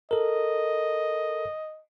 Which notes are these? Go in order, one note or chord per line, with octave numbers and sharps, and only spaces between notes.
A4 A#4 D#5